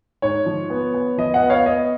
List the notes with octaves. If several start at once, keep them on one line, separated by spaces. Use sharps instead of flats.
G#2 C#5
F3
B3
B3
F3 D#5
D#5 F#5
B3
C#5 F5
B3 D#5